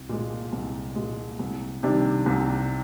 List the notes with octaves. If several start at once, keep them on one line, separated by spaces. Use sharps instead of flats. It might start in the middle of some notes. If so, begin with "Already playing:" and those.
Already playing: C2
A#2 G#3
C2
A#2 G#3
C2
C3 D#3 G3 D4
C2